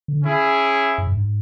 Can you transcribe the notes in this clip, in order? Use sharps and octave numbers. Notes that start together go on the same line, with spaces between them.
D3
C#4 E4 G#4
F#2
G2
G#2